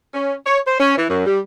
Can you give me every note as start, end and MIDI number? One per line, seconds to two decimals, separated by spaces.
0.14 0.34 61
0.45 0.58 73
0.67 0.79 72
0.79 0.96 61
0.97 1.07 52
1.08 1.22 42
1.25 1.39 55